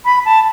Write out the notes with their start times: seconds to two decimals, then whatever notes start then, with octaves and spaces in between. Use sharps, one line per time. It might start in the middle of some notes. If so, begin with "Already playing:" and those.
0.05 B5
0.25 A5